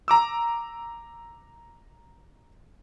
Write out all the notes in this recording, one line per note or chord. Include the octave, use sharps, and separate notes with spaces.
A#5 D6 E6